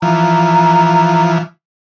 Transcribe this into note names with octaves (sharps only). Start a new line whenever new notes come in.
E3 F3 A#5